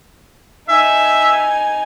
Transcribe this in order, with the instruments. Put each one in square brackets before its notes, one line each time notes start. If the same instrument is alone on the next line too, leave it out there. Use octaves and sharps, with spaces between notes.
[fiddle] D#4 G#5 [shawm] E5